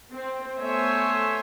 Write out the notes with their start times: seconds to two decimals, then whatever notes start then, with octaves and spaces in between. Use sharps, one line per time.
0.12 C4
0.58 A3 B3 C5 C#5 E5 G#5